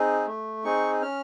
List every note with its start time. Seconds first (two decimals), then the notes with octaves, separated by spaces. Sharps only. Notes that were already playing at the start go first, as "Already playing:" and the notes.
Already playing: C4 D#4 G#4
0.27 A3
0.64 C4 D#4 G#4 C#6
1.02 C#4 F6